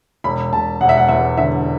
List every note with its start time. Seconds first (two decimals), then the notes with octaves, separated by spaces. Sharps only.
0.24 E1 B5
0.52 E1 A5
0.81 E1 F#5
0.89 E5
0.97 F#5
1.09 E2 E5
1.37 D3 E5